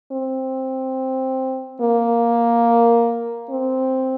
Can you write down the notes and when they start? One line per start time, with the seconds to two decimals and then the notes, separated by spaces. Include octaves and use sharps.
0.12 C4
1.81 A#3
3.50 C4